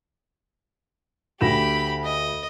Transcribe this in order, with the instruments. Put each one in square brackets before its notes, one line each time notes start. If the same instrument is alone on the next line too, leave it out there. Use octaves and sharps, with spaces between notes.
[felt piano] D2 A#6 E7 [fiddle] G4 B5
[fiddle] D#5